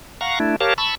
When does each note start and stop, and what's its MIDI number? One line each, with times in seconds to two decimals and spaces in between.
0.21 0.39 77
0.21 0.39 78
0.21 0.39 82
0.21 0.39 85
0.40 0.56 57
0.40 0.56 62
0.40 0.56 64
0.61 0.74 67
0.61 0.74 70
0.61 0.74 73
0.61 0.74 77
0.61 0.74 81
0.78 0.95 81
0.78 0.95 83
0.78 0.95 85
0.78 0.95 88